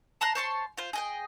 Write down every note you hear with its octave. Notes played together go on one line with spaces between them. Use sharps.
A5 A#5 C6 F#6
C5 C#5 A5 C6
F4 C5
G#4 D#5 G5